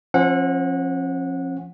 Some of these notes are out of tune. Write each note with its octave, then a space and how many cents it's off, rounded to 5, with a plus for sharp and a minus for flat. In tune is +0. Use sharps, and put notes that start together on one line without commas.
F3 +0 C#4 -45 F#5 -20